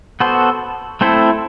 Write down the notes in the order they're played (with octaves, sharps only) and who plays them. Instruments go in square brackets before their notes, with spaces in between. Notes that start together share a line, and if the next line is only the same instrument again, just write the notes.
[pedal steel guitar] B3 F#4 A4 C5
A3 C4 E4 A4 C5